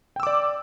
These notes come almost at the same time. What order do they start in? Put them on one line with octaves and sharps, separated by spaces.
G5 E6 D6 D5